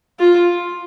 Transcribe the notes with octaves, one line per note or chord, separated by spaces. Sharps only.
F4